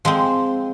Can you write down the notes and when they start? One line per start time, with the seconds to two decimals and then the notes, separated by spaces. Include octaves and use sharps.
0.05 F3 G#3 C4